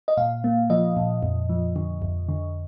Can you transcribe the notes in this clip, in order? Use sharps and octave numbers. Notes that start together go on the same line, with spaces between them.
D#5
A#2 F5
A#3
F3 D#5
A#2
F2
F3
D3
F2
D3